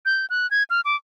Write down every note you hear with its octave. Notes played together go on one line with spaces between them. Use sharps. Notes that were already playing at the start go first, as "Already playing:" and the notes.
G6
F#6
G#6
F6
D6